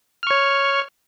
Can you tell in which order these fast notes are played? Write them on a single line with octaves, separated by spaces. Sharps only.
F6 C#6 C#5